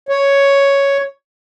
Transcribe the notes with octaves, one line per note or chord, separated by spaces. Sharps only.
C#5